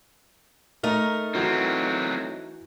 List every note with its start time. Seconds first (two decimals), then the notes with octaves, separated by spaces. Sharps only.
0.83 A3 D#4 A#4
1.35 E3 F#3 C4 F#4